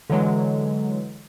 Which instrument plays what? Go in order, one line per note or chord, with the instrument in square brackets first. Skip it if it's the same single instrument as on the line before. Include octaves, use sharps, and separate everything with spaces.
[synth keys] D3 E3 F#3 G#3